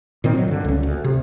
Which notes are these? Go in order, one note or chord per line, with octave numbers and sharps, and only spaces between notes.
A#2 D#3 C4
F#3
G2 D3
C#2 C#4
D2
C3